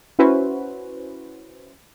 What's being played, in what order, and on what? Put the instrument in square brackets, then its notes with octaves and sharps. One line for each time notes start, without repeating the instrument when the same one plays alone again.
[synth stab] C#4 E4 F#4 B4 C5